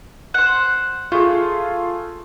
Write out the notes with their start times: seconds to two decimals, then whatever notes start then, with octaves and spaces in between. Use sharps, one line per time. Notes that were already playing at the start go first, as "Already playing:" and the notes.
0.34 C5 F#5
1.12 A3 F4 G#4